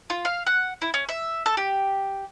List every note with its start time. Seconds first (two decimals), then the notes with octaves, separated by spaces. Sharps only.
0.10 F4
0.25 F5
0.47 F#5
0.82 E4
0.94 C#4
1.09 E5
1.46 A4
1.57 G4